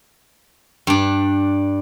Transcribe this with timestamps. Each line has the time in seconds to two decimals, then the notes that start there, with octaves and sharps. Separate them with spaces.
0.87 G2 D4